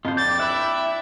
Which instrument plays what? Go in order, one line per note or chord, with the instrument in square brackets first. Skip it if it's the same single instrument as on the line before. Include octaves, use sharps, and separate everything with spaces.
[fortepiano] F2 [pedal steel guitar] F4 C5
[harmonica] D4 G5 D6 [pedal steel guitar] G6 [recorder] A6
[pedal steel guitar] E4 B5 [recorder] E5 [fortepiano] F#6